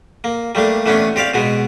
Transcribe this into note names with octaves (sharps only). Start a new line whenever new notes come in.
A#3
G3 A3 A#3 D4
E3 A3 B3 C#4 D4
C4 G4 D5 F5
B2 G#3 B3